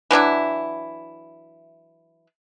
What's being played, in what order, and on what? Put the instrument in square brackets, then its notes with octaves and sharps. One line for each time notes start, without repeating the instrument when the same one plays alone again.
[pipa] E3 F#3 D4 E4